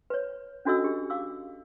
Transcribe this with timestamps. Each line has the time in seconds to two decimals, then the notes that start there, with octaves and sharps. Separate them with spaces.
0.10 B4 C#5
0.65 C#4 D4 F#4 A4 D#5 E6
0.84 D4 G4
1.10 F5 D6 E6